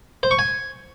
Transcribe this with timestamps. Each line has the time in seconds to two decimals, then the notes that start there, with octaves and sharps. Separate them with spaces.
0.23 C5
0.31 C#6
0.39 G#5